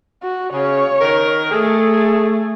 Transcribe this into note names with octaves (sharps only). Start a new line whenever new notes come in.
F#4
C#3 C#5
D#3 A#4
A3 G#4 A4